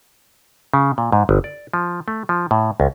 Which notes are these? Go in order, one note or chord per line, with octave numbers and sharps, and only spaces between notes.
C#3
A#2
G#2
G1
D5
F3
A3
F3
A2
C#2